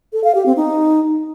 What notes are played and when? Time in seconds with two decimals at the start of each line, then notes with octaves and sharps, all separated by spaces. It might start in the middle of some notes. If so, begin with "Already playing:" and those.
0.13 A4
0.24 F5
0.35 G4
0.46 C4
0.57 D#4